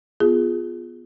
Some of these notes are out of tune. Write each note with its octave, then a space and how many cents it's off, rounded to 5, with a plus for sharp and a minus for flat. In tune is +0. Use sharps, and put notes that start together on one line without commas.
B3 +0 F4 +0 G#4 +0